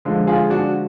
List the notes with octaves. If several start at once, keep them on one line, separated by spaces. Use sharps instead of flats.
D3 F3 G#3
F4 G#4
D4 F#4